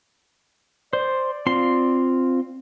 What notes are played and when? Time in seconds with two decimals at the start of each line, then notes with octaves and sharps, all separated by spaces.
0.93 C5 D5
1.46 C4 F4 C6